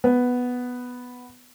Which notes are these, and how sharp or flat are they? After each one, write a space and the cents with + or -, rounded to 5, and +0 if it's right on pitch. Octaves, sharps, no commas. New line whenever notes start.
B3 +0